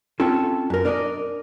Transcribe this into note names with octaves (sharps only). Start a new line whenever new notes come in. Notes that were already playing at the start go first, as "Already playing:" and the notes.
C4 C#4 F4 A4
F#2 A#4
D4 A#4 D5 D#5